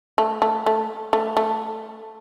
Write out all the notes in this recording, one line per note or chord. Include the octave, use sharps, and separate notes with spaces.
A3
A3
A3
A3
A3